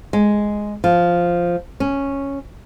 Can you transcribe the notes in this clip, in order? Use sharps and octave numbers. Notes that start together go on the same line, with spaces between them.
G#3
F3
C#4